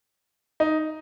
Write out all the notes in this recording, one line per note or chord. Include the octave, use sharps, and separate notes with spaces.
D#4